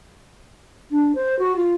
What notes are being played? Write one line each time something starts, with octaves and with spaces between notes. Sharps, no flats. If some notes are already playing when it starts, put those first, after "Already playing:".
D4
C5
F#4
F4